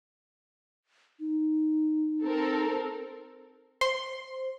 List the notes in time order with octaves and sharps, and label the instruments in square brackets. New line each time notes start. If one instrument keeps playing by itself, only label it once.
[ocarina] D#4
[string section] C4 A4 A#4
[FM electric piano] C5 [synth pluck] C6